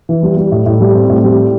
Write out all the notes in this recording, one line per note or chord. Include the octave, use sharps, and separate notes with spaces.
E3
G3
G3
A2
A2
G3
C4
A2
G3